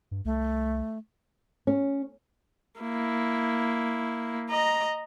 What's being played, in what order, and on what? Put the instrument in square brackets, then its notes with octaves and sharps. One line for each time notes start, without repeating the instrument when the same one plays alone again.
[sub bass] G2
[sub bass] C2 [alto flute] A3
[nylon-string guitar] C#4
[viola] A#3 E4
D#5 A#5